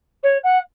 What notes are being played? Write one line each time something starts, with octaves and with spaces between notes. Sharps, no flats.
C#5
F#5